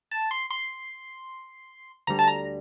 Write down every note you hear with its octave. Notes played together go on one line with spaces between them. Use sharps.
A5
C6
C6
D2 D3 G3 A#5
A5
A#5